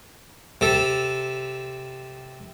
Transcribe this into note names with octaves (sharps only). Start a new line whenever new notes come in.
C3 A4